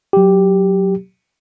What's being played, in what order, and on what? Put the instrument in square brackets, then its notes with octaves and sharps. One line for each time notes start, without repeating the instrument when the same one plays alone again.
[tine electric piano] F#3 G4